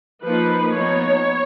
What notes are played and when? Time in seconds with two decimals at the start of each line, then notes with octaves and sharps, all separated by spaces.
0.23 F3 A#3 D#4 B4
0.73 F3 B3 D#4 C#5